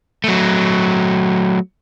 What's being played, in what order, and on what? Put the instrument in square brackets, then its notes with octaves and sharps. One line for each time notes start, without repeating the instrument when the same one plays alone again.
[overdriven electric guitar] F#3 A3